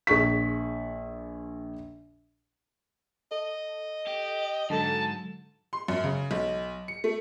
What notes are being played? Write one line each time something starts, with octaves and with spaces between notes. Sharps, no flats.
A#1 G#4 C#6 B6
A4 D#5
G4
G#2 D3 F#3 A4 A5
C6
F#2
C#3
B1
C#7
A3